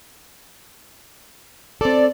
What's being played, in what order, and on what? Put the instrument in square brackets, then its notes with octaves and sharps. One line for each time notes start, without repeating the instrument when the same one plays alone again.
[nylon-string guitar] C4 A4 [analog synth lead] D5